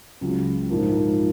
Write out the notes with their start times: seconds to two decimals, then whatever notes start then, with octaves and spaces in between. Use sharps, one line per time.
0.21 C#2 C#3 F#3
0.70 A#1 G#2 F3 A#3